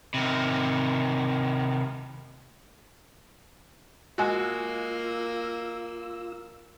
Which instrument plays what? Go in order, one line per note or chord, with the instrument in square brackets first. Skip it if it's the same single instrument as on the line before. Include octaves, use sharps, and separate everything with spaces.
[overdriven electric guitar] C3 D#3
[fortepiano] G#3 F#4 [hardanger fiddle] A#3 [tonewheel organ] F4 E6